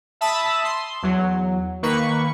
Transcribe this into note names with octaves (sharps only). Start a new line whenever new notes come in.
E5 A5 B5 D#6 E6
C6
E2 F#3
D#3 A#3 B4 C#6